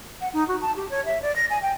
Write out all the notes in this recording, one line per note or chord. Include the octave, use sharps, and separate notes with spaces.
F#5
D#4
F#4
A5
G4
C#5
E5
D5
A#6
G#5
G5